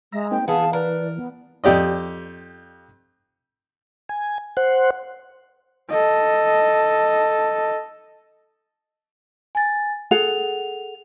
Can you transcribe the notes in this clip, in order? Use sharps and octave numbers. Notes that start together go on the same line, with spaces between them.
G#3 E5 A#5
A#3 C4 D#4 G5
E3 B3 G#4 F5 A5
A#4 B4 D5
B3
F2 G4 D5 D#5
G#5
C5 F#5
A4 D#5
G#5 A6
G#4 A4 F#5 F7